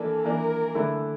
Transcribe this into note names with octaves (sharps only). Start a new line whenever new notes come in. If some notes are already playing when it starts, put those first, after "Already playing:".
Already playing: E3 A#3 D4 A4
E3 A#3 D4 A#4
D3 A3 E4